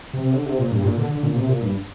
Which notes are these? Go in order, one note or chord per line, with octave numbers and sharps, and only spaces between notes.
C3
D3
C3
A#2
G2
A#2
D3
D3
A#2
C3
A#2
G2